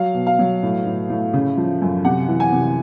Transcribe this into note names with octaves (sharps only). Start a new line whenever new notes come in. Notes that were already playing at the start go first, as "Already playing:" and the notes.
Already playing: F#3 F5
B2
F5
F#3
A2
A2
A2
C#3
F3
F#2
C3 F#5
E3
G#5
C3